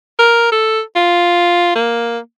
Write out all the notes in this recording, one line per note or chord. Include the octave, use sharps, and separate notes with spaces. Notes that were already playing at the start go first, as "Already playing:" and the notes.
A#4
A4
F4
A#3